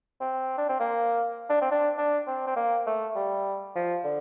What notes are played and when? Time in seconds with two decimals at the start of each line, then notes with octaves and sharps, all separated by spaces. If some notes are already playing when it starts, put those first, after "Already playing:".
0.20 C4
0.58 D4
0.69 C4
0.80 A#3
1.49 D4
1.61 C4
1.71 D4
1.98 D4
2.27 C4
2.47 C4
2.56 A#3
2.86 A3
3.16 G3
3.75 F3
4.04 D3